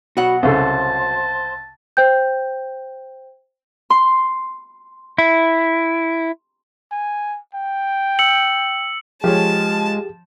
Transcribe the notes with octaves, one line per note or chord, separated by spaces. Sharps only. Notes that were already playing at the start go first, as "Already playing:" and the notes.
B2 F#3 F#4 F#5
C2 C#3 A4 C5 A5
C5 G5 G6
C6
E4
G#5
G5
E6 C#7 F#7
F3 G#3 G4 G#4 C#5 A5